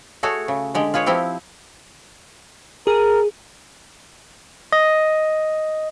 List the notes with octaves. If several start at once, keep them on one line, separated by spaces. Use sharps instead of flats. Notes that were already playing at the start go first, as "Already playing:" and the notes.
A3 F#4 G#4 A4 C#5
C#3
D3 G#3 G4
F4 G#4 B4 C#5
F3 C4 E4 G4
G#4 A#4
D#5